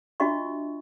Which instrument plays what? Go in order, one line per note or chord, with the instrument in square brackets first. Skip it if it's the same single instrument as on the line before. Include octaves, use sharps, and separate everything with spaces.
[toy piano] D4 F4 F#4 D#5 E5 C#6